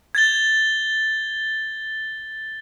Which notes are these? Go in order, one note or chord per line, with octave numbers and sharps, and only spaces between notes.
G#6 A6 G7